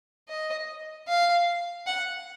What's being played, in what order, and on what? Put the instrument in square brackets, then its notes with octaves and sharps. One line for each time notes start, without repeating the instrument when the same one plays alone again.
[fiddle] D#5
F5
F#5